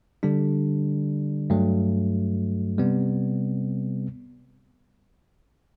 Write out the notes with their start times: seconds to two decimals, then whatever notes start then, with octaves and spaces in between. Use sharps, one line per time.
0.23 D3 G3 D4
1.50 G2 F#3 A3
2.78 C3 G3 B3